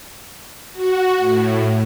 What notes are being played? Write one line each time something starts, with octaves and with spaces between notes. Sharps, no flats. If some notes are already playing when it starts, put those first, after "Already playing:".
F#4
A2